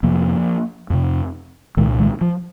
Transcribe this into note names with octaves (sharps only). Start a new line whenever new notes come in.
F2 C3 F3 A#3
F2 C3
C2 A#2 D#3 G#3
D#3 G#3
F3